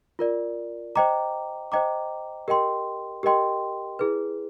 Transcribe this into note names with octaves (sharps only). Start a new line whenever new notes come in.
F4 A#4 D5
C5 D#5 G5 A#5 D6
C5 D#5 G5 A#5 D6
G4 A#4 D#5 G5 C6
G4 A#4 D#5 G5 C6
E4 G#4 B4